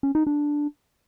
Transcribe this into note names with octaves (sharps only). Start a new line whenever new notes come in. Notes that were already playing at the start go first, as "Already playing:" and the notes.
C#4
D#4
D4